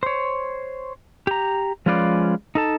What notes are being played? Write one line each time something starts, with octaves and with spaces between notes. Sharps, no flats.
C5 C#5
G4 A#5
F3 G#3 C#4 F4 B4 D5
D#4 A4 A5